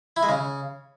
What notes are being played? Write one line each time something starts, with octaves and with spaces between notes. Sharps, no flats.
E4
G#3
C#3